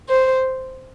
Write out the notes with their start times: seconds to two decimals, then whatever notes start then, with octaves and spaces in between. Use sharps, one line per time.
0.09 C5